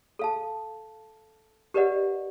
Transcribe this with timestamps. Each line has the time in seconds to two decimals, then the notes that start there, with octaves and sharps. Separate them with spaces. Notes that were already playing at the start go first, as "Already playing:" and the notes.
0.19 A4 F5 A5
1.74 G4 A#4 B4 D5 D#5 F#5